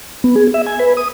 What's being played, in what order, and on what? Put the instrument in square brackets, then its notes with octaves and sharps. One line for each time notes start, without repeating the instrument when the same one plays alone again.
[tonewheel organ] B3
G#4
E5
G#5
B4
D#6